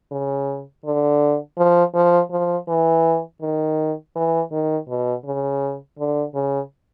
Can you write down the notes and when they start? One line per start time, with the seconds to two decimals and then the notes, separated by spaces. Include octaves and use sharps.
0.12 C#3
0.85 D3
1.58 F3
1.95 F3
2.31 F3
2.68 E3
3.41 D#3
4.16 E3
4.52 D#3
4.89 B2
5.25 C#3
5.99 D3
6.35 C#3